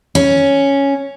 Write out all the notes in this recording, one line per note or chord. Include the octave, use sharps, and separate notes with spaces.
C#4